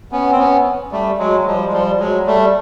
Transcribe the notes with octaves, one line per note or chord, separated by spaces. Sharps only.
B3 C#4
C4
B3 C#4
G3 A3
F#3 G#3
G#3
F3 G3
G#3
F3 G3
F#3 G#3
G3 A3